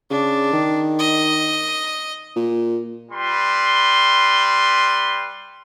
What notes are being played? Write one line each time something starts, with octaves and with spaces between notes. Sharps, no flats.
C#3 D4
D#3
D#5
A#2
G3 B4 C6